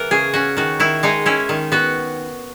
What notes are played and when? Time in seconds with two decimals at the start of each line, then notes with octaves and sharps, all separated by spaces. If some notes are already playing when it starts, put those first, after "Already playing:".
Already playing: E3 B3 A#4
0.11 C#3 G#4
0.34 C#4 F#4
0.57 D#3 F#4
0.80 D#3 E4
1.03 G#3 D#4
1.26 C#4 E4
1.49 D#3
1.72 B3 F#4